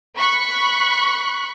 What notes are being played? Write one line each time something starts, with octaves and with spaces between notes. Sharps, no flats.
B5 C#6 F#6